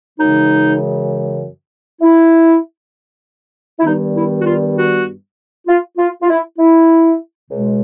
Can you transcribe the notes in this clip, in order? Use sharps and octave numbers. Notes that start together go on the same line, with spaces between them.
F#2 C#3 E3 G#3 D#4
E4
E4
G2 D#3 G3 B3 D#4
E4
F#4
F4
F#4
F4
F4
F4
E4
E4
C#2 B2 G#3